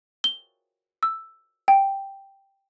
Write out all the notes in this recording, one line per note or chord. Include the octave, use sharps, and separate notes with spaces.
G7
E6
G5